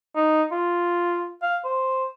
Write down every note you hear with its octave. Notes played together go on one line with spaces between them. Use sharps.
D#4
F4
F5
C5